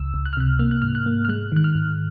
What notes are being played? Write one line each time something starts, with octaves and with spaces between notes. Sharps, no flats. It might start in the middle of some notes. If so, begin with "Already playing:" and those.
Already playing: C#2 E6
C#2
F#6
F6
C3 F#6
A#3 F6
F#6
G#2 F6
F#6
A#3
F6
G#3 F#6
D#3 F#6
F6
G#2